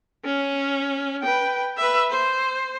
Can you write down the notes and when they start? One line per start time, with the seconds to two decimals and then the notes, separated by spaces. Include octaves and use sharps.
0.25 C#4
1.23 B4 G5
1.77 B4 E5
2.10 C5